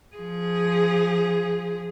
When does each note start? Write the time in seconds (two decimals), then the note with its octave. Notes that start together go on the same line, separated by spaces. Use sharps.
0.16 F3 G#4